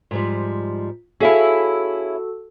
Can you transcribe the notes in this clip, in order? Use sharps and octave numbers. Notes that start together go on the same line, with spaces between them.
G#2 F3 G3
C#4 E4 F#4 G#4 A4 E5 F5